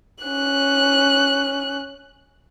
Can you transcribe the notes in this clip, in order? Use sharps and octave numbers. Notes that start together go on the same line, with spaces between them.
C#4 F#6